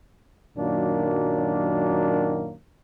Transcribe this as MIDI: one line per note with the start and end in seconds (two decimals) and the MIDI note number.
0.57 2.54 42
0.57 2.54 46
0.57 2.54 51
0.57 2.54 54
0.57 2.54 58
0.57 2.54 62